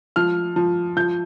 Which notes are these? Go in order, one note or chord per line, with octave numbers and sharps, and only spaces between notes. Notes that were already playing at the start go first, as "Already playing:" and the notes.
F3 F6
F3
F3 G6